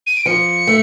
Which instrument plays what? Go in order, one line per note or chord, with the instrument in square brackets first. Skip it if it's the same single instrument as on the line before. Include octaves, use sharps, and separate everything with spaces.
[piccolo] D#7
D7
[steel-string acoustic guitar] F3 [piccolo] C#7
[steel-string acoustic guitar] A3